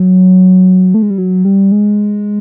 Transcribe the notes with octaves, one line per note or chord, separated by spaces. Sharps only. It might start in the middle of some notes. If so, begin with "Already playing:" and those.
Already playing: F#3
A3
G#3
G3
F#3
G3
G#3